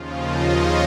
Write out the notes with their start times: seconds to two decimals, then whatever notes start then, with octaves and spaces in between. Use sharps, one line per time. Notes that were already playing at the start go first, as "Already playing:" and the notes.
Already playing: D#2 C#3 F3 F4
0.16 D#5
0.44 C#5